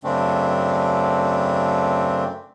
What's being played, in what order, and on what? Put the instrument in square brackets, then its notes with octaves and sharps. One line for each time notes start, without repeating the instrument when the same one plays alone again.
[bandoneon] F#2 C#3 A3 C4 D4